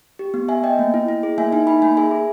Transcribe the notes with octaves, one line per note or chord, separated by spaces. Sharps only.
G4
B3
B3 E5 G#5
B3 D#5 G5
A#3
E4
E4
G#4
A#3 E5 G#5
D#4 E5 G#5
D#4 G#5 B5
A#3 G#5 B5
G#4 E5 G#5
G#4